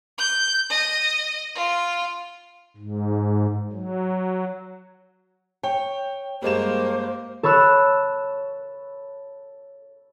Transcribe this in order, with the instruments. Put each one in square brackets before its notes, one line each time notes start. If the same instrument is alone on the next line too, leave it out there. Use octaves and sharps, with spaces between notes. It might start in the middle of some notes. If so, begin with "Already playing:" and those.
[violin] G6
D#5
F4
[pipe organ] G#2
F#3
[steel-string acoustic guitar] C#5 [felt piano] G5
[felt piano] G2 G#3 E7 [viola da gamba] A#3 [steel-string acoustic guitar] F#4 G4 A#4 [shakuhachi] C5
[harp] A4 C#5 B5 E6 F#6